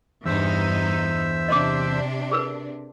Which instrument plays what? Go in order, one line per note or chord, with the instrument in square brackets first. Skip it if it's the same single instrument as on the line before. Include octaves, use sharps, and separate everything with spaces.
[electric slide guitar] E2 [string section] G2 D#4 [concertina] C5 E5 E6
[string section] C3 D4 [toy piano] D#5 C6 D6
[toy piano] G#4 A#4 B4